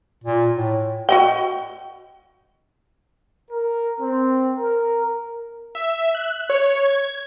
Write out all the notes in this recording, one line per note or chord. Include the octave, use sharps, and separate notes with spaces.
A#2
A2
F#4 D#5 G5
A#4
C4
A#4
E5
F#6
C#5
G#6